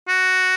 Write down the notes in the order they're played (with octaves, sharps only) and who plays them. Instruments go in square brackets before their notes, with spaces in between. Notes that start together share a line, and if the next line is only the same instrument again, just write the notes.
[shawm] F#4